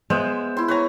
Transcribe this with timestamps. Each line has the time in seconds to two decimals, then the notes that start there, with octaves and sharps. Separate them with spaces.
0.10 G#3 B3 C5 E5
0.57 E4 C6
0.68 B4 C#5 A#5